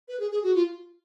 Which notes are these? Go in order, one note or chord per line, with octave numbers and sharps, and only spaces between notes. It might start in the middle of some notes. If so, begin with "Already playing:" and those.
B4
G#4
G#4
F#4
F4